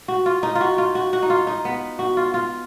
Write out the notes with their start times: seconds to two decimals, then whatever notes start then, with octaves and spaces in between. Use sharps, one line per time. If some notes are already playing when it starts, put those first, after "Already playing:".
0.08 F#4
0.26 F4
0.43 D#4
0.55 F4
0.61 F#4
0.78 F4
0.95 F#4
1.13 F#4
1.23 D#4
1.30 F4
1.47 D#4
1.65 B3
1.99 F#4
2.17 F4
2.34 F4